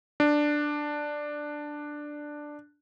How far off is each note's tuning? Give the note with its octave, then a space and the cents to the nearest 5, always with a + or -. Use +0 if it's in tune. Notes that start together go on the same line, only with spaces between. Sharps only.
D4 +5